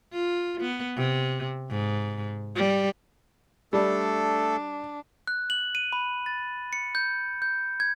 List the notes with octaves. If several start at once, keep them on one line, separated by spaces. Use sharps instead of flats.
F4
B3
C3
G#2
G3
G3 A3 D4 A4
F#6
F#7
D#7
B5
A6
C#7
G6
G6
G#6